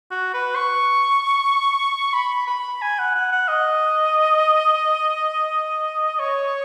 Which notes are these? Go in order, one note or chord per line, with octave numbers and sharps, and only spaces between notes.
F#4
B4
C#6
B5
B5
G#5
F#5
F#5
F#5
D#5
C#5